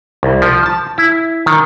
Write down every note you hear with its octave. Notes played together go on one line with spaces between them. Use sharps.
C2
F3
A5
E4
D#3